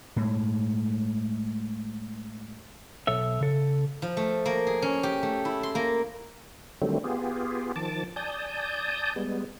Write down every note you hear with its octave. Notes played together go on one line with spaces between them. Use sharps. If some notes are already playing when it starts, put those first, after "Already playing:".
A2 G#3
B1 A4 C#5 E5
C#3 A4
F3
A3
A#3
G#4
C#4
G4
A3
E4
C6
A#3
D3 D#3 F#3 G3 A3 C4
B3 F4 G4 G#4
D#3 F3 A5 D6
D5 G#5 A5 D#6 G6
G3 G#3 B3